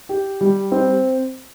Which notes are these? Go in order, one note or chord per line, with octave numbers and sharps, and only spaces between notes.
G4
G3
C4